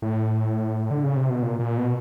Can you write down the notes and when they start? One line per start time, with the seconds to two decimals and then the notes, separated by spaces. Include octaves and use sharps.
0.02 A2
0.91 D3
1.03 C#3
1.16 C3
1.30 B2
1.42 A#2
1.60 A#2
1.78 B2